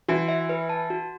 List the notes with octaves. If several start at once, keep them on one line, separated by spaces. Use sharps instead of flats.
E3 F#4
E5
B4
A5
F#4